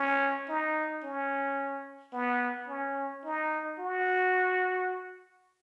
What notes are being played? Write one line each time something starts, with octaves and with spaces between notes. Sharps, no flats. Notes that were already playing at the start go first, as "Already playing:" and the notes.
Already playing: C#4
D#4
C#4
B3
C#4
D#4
F#4